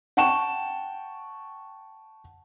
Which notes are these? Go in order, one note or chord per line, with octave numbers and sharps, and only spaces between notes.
F#5 G5 A5 C#6 E7